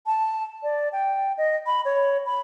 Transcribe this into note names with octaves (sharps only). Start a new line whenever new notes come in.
A5
D5
G5
D#5
B5
C#5
B5